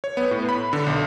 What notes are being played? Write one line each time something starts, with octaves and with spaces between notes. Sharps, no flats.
C#5
B3
A2
B5
D3
B1